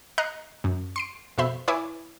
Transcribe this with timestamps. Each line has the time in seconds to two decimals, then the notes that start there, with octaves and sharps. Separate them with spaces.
0.18 D#5 A#5 F#6 C7 C#7
0.64 F#2
0.96 C6 C7 D7
1.38 F2 B2 C5 E5 B5
1.68 E4 B4 C#5 E5 G#5 D6